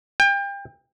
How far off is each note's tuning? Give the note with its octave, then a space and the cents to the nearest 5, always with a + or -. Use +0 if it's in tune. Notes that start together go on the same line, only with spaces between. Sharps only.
G5 +30